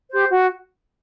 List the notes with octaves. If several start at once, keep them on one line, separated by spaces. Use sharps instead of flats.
G4 C5
F#4